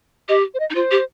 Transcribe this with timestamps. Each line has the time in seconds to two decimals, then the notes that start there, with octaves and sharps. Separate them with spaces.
0.29 G4 D#5
0.54 C5
0.60 D#5
0.70 D#4
0.75 F4 C5
0.91 G4